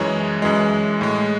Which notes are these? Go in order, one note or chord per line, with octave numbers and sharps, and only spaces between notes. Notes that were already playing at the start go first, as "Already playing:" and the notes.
Already playing: F#2 E3 G#3 C#5
F#2 E3 G#3
A2 G#3